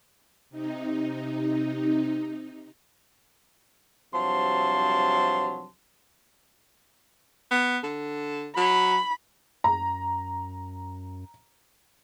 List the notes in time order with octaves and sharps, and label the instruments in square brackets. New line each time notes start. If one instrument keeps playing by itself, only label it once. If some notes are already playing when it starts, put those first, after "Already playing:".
[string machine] C3 D#4
[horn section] G2 C3 F3 F#3 A5 C6
[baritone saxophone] B3
D3
[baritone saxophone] F#3 [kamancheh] B5
[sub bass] F#2 [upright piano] A#5